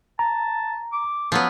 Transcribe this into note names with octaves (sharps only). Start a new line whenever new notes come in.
A5 A#5
D6
F3 F#3 B3 F4